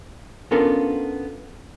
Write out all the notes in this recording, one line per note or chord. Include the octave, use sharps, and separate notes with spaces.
B3 C#4 D4 F4 A4 A#4